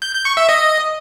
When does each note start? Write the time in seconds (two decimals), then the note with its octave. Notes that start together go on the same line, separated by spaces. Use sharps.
0.02 G6
0.14 G6
0.25 C#6
0.37 E5
0.49 D#5